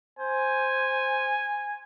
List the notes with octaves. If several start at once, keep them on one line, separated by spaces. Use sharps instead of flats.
C5 G#5